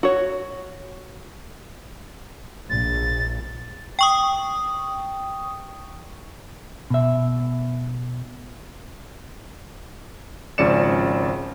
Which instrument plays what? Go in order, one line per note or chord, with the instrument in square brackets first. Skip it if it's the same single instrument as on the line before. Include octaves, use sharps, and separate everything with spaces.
[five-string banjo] F#4 C#5
[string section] A#1 [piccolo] A6
[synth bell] G5 C#6 D#6
[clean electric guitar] B2 E5
[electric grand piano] G#1 C#3 F3 D5 C#7 E7